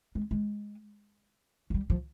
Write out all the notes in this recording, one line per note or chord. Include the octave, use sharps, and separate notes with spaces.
G#3
G#3
F#3
G3
F3